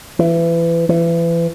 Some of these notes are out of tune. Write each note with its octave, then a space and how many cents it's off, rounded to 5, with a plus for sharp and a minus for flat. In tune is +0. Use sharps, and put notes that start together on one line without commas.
E3 +25
E3 +30